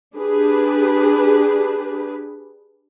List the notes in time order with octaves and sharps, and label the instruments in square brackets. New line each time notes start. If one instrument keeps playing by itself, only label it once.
[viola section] D4 G4 G#4 B4